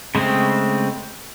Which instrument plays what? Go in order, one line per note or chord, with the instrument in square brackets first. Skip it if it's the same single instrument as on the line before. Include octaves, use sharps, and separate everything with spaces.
[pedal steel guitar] C#3 G#3 A3 C4